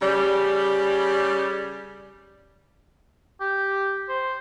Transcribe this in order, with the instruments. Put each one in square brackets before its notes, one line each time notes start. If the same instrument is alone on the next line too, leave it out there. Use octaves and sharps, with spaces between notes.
[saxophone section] C#3 G3
[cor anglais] G4
C5